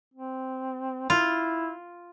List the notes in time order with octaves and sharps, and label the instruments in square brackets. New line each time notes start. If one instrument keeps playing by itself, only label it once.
[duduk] C4
[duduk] E4 [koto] F4